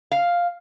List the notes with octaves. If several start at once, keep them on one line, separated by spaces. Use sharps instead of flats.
F5